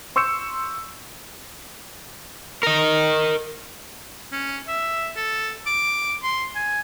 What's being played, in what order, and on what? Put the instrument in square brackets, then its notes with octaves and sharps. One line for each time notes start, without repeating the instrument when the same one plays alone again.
[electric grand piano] C6 C#6 E6 G6 C#7 E7
[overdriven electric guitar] A#4 D#5
[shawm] C#4
E5
A4
D6
C6
G#5